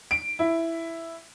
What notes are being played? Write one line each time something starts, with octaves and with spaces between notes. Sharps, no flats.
D7
E4